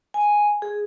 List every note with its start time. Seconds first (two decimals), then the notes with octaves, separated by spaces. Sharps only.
0.14 G#5
0.62 G#4